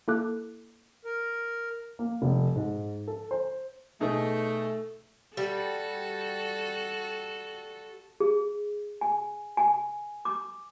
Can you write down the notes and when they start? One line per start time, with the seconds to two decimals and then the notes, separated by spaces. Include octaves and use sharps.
0.08 A#3 E4 A4 D6 F#6
1.05 A#4
1.99 A#3
2.22 F1
2.56 G#2
3.08 A4
3.31 C5
4.00 B2 A3 D#4 G#4
5.37 G3 F#4 A4
8.20 G#4
9.01 G#5
9.57 G#5
10.25 D6